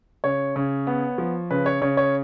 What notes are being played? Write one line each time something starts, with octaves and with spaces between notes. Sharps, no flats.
C#3 C#5
C#3
B3
F3
C#3 B4
C#5
C#3 C#5
C#5